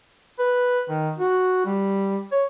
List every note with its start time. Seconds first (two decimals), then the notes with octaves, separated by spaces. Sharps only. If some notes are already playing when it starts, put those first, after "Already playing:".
0.39 B4
0.89 D#3
1.18 F#4
1.65 G3
2.32 C#5